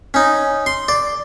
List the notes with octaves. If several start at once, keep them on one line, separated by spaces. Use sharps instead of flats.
C#4 D#4
C6
D5